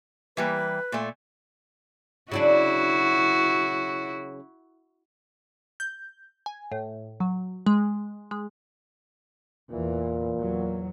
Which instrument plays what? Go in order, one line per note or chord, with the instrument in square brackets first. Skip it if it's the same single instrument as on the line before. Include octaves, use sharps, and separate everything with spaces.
[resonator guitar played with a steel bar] E3 G3 A#3 [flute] B4
[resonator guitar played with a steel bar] A#2 A3
[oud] C#3 F#3 D4 [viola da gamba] E4 F#4
[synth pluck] G6
G#5
A2
F#3
G#3
G#3
[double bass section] E2 E3 [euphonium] A#2
[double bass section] E2 F#3